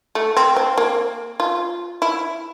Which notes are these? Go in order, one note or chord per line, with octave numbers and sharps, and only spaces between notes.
A3
C4
C4
A#3
F4
E4